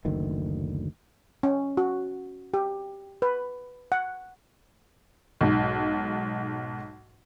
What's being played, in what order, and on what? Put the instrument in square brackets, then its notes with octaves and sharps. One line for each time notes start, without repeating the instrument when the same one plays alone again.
[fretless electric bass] F#1 D2 D#3
[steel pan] C#4
F#4
G4
B4
F#5
[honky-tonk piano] B1 G#2